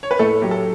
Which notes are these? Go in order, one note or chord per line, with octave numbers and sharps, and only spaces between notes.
C#5
B4
A2 A3 A4
F#3 A3 G4
A4